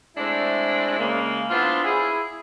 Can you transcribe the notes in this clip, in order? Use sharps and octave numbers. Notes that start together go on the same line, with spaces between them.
G#3 A3 C4 D4 E4
C#3 G#3 A#3
B3 D4 E4 F4 B4 C5
E4 G#4